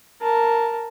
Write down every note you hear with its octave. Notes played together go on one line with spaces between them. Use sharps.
A#4 A5